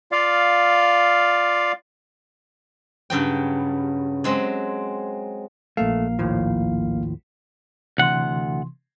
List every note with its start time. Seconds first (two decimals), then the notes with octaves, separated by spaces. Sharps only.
0.12 F4 D5 F5
3.10 G2 C#3 F#3 G5
4.24 F#3 G#3 C4
5.77 A#1 A3 A#3 F5
6.19 D#2 A2 F3
7.98 D2 C3 E3 F#5 C6